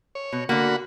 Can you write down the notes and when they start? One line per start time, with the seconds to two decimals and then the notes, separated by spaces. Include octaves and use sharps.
0.15 C#5
0.33 B2
0.49 D3 A#3 F#4 F#5 B5